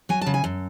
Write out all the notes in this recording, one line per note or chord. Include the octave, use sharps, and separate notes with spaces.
F#3 G#5
A5
C#3
G#5
F#2